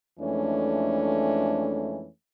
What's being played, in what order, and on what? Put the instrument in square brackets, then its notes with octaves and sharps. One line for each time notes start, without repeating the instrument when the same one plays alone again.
[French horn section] F2 E3 G#3 A3 C#4 D4